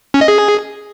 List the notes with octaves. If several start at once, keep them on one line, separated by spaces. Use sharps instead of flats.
C#4
D#5
G#4